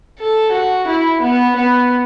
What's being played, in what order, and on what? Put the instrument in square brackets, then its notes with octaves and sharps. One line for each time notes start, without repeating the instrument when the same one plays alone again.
[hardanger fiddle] A4
F#4
E4
B3
B3